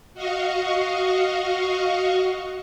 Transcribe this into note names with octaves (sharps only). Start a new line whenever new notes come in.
F#4 D#5 F5 C#6